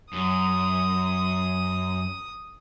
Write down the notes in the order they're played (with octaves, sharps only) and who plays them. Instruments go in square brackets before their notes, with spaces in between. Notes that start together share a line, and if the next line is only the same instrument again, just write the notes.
[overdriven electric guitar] F#2 [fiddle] D#6